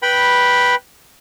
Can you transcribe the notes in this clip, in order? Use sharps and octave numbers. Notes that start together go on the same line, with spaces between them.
B4 G5 B5